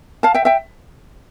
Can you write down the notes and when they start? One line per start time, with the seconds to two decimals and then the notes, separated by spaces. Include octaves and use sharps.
0.23 F5 A5
0.34 E5 G5
0.45 E5 G5